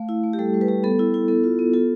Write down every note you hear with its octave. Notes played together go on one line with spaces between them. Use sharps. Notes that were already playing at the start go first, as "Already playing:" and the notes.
Already playing: A3 F5
E4
A3
G4
G3 A4
G3
B4
G3
B3 A4
E4
E4
B3 A4
F4
B3
F4 A4